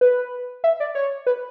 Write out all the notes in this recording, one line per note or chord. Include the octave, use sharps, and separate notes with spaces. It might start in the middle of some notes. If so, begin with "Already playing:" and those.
B4
E5
D5
C#5
B4